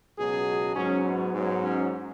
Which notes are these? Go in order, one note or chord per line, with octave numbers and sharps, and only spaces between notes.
C#2 B2 F#3 G#4
G#2 F#3 C#4
B3
G#2 F#3
C#4